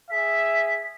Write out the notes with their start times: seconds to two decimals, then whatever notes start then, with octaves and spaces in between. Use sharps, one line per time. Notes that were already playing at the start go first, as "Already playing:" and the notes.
0.10 G#4 E5 B6